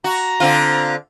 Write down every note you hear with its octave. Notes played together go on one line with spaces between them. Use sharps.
F#4 A#5
D3 C4 F4